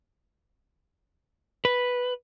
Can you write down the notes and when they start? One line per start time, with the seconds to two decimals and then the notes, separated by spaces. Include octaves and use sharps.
1.65 B4